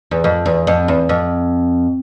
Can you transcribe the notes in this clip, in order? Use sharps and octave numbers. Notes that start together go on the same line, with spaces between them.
E2
F2
E2
F2
E2
F2